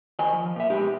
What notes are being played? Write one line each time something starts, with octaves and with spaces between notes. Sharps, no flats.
D#3 D#5 G#5
F3
A#2 E5
B2 G#3 D#4 G4